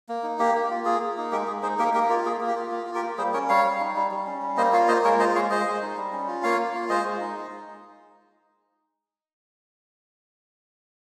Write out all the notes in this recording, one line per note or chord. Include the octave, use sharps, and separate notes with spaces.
A#3
D#4
A#3 G4
A#3
F4
A#3 G#4
A#3
D#4
G#3 G4 A#4
G#3 G#4
D#4 G#4 C5
A#3 G4 A#4
A#3 G4 A#4
F4 G4 A#4
A#3 G#4
A#3
G4
F4
A#3
F4
G4 A#4
A#3
G3 G#4 C5
C#4 A#4 C#5
G3 C#5 F5
G3
D#4
G3
G3
C#4
G3
A#3 C5 D#5
F4 C#5 F5
A#3 C5 D#5
G#3 A#4 C#5
F4 C5 D#5
G#3 C#5 F5
G#3 C5 D#5
G#3
D#4
G3
C#4
F4
A#3 C#5 F5
A#3
F4
G#3 C5 D#5
G#3
D#4